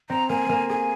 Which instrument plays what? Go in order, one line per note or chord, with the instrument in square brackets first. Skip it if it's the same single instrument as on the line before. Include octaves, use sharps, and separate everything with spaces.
[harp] C4 [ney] A#5
[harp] A#3 [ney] G#5
[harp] A#3
[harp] G#4 [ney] G#5